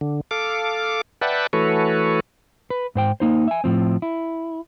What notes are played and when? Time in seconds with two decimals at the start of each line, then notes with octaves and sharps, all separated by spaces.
0.01 D3
0.31 A4 F5 D6
1.21 B4 D5 E5 F#5 G5 A5
1.53 E3 A3 F#4 A4 B4 C#5
2.70 B4
2.95 G#2 C5 G5
3.20 A#3 D#4 C5
3.48 E5 G#5
3.64 A2 F3 C4
4.02 E4